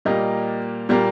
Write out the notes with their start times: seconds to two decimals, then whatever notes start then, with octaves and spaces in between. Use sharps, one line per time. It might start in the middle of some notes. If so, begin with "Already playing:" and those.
0.05 A#2 G3 A#3 D#5
0.89 A#2 G3 A#3